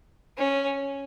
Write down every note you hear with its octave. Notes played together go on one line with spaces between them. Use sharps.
C#4